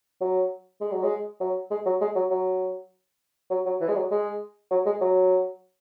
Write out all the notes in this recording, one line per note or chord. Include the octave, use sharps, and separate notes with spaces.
F#3
G#3
F#3
G#3
F#3
G#3
F#3
G#3
F#3
F#3
F#3
F#3
E3
G#3
F#3
G#3
F#3
G#3
F#3